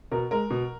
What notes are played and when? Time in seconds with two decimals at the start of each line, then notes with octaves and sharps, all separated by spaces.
0.11 B2 A#4
0.31 G#3 A#4
0.50 B2